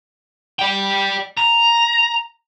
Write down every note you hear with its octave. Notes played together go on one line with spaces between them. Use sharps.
D5 G5
A#5